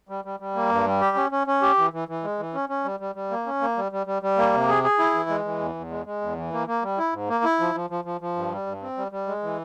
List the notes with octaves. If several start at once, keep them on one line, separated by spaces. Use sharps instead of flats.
G3
G3
G3
A#3
G2
G3
G4
C#4
C#4
C#4
G4
E3
E3
E3
G#3
E3
C#4
C#4
G3
G3
G3
A#3
C#4
A#3
G3
G3
G3
G3
A#3
C3
G#4
G#4
E4
E3
G#3
E3
E2
E2
G#3
G#3
E2
E3
A#3
A#3
G3
E4
G#2
A#3
E4
F3
F3
F3
F3
F3
G2
G3
G2
C4
G3
G3
G#3
E3